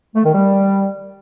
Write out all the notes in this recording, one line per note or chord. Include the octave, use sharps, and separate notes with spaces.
A3
D#3
G3